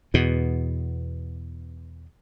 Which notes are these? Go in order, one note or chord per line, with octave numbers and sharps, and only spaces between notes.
E2 B2